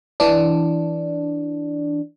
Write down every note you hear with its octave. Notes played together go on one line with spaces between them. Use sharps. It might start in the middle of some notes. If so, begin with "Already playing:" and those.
E3 D4